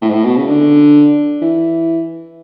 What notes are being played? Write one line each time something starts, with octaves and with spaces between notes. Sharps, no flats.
A2
G#2
A2
B2
C#3
D3
E3